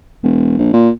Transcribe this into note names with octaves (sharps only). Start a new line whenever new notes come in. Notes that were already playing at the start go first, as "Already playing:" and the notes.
E1
A#1
A#2